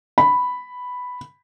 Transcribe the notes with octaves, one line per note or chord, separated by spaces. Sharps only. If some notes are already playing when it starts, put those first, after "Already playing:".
B5